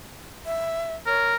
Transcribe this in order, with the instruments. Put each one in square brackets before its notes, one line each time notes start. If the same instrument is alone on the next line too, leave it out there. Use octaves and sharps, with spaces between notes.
[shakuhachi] E5
[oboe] A#4 [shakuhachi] C#5